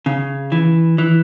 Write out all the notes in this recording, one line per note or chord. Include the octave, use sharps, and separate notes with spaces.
C#3
E3
E3